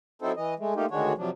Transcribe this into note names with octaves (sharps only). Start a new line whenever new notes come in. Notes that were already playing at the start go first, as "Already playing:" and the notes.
F#3 C4 D#4 E4 A4 C5
E3 D#5
G#3 A3
A3 A#3 D#4 F4 G4
D2 D#3 G#3 D4 F#4 C#5
C3 F3 F#3 D4